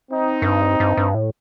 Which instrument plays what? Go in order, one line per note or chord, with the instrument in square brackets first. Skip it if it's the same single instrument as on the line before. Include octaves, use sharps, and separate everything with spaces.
[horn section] C4 D#4
[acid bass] F#2
G2
G2
G2
A2